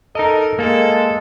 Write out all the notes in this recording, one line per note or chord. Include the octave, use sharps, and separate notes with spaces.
D#4 A4 A#4 D#5
G#3 A#3 A4